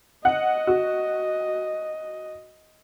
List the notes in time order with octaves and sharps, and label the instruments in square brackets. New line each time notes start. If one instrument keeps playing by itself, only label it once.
[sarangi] D#5 [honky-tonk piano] F#5
[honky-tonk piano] F#4